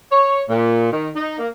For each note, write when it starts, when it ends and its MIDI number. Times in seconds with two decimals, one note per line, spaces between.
0.11 0.41 73
0.48 0.91 46
0.91 1.07 51
1.15 1.37 63
1.38 1.47 58